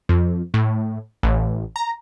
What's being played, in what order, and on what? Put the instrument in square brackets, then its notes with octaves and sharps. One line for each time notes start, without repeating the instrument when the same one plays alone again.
[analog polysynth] F2
A2
A1
A#5